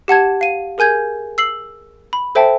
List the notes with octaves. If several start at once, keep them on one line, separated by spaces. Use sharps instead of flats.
G4 F#5 A5 G#6
F5 D#7
G#4 A#4 G#5 G6 G#6
E6 C7 F#7
B5
A4 C5 E5 G5 A5